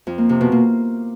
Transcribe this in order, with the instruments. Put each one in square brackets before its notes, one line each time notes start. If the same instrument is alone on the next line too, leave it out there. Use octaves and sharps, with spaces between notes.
[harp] F2
A#3
C3
B2
A#3